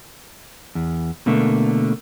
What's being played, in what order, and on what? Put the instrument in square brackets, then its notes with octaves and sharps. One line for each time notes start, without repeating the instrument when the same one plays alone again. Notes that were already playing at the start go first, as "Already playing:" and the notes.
[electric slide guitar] E2
B2 D3 A3 A#3